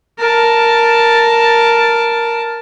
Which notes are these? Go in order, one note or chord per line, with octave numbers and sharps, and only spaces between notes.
A#4 A5